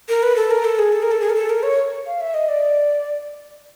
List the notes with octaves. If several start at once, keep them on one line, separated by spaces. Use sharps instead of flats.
A#4
B4
A4
A#4
A4
G#4
A4
A#4
A4
G#4
A#4
A4
A#4
C#5
F5
E5
D#5
D5